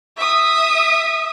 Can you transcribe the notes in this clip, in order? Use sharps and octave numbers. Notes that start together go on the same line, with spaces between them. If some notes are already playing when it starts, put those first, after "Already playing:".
E5 D#6